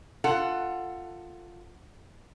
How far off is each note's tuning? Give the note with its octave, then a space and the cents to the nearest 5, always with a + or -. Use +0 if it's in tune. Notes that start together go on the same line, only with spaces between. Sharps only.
F4 +0 A4 +20 F#5 +0